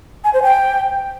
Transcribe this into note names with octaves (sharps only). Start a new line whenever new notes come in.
G#5
C5
G5